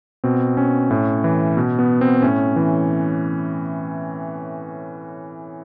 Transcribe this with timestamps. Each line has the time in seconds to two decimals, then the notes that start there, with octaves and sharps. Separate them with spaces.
0.24 B2 C4
0.57 C#4
0.91 A2
1.24 E3
1.57 B2
1.79 B3
2.01 C4
2.22 A2 C#4
2.56 E3